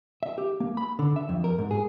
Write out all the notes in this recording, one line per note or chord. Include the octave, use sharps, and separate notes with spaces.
E5
G4
A#3
B5
D3
E5
F2
A#4
G#2
G#4